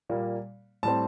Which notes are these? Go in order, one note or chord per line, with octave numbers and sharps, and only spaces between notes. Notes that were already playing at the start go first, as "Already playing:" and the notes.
A#2 G3 A#3
A2 G3 C4 A5